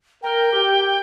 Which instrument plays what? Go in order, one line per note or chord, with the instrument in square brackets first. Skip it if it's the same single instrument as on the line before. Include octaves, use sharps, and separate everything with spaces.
[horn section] A#4 [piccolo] G5
[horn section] G4